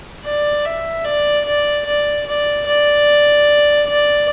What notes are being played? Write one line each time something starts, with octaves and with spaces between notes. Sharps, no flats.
D5
E5
D5
D5
D5
D5
D5
D5